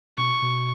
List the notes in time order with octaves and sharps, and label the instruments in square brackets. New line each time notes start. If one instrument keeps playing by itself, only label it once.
[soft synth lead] B2 [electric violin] C#6
[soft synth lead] B2